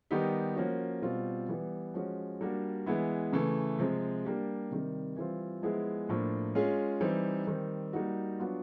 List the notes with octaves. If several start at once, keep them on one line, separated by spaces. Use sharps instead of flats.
D#3 G3 B3 D#4 G4
F3 A#3 C#4 F#4
B2 G3 C4 F4
E3 G3 B3
F3 G#3 C#4 F#4
G3 A#3 D4 F#4
E3 G#3 B3 E4
C#3 E3 A3
C3 F3 G#3
G3 A#3 D4 G4
C3 D#3 G3
E3 G3 C4 F4
F3 G#3 B3 E4 G#4
A2 F3 A#3 D4
G#3 C#4 F4 G#4
E3 G3 C4 D#4
D#3 G3 C4
G3 A#3 D#4 F#4
F#3 B3 D4 F4